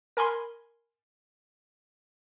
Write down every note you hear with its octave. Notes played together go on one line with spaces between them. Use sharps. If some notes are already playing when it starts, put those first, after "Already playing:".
A#4 G#5 B5 C6